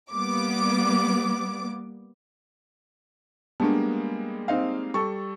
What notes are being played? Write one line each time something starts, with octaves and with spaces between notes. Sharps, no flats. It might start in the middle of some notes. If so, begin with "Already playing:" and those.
G3 A#3 B3 D6
G3 G#3 A#3 B3 D4 A5
C4 D#4 F5
G3 A4 C#6